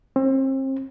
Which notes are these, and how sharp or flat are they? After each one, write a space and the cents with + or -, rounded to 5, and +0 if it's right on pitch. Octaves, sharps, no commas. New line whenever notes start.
C4 +35